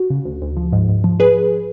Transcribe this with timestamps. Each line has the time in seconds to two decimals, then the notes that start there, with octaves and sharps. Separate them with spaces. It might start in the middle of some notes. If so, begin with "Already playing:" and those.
Already playing: F#4
0.10 C#3
0.25 D2
0.42 D2
0.57 F3
0.73 G#2
0.89 G#2
1.04 F3
1.20 F3 G#4 B4